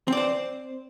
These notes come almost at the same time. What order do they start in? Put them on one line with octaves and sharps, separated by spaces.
C4 D5 C5